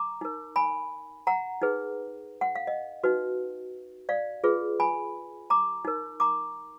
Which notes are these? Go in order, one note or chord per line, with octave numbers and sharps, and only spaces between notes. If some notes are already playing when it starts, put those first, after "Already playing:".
Already playing: A#5 D6
D#4 A#4
G#5 B5
F#5 A#5
D#4 G#4 B4
F#5
F5
D#5
D#4 F#4 B4
D5 F5
F4 G#4 B4
G#5 B5
A#5 D6
D#4 A#4
A#5 D6